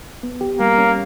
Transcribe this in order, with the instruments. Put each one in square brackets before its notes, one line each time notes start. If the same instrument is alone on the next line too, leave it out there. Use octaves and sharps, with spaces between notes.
[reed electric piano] B3
G4
[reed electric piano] G3 [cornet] A#3
[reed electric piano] C#4